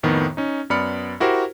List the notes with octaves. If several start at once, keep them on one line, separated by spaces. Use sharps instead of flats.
F2 A2 D#3 B3
C#4 D#4
F#2 B3 D5 B5 F6 C#7
E4 F#4 G4 A#4 C5